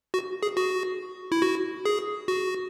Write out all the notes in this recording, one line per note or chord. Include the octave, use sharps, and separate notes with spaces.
F#4
G#4
F#4
E4
F#4
G#4
F#4